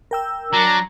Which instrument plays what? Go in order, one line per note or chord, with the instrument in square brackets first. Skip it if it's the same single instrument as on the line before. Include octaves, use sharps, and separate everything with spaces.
[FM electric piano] A#4 G5 E6
[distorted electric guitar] F#3 [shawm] D4 [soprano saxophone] A#5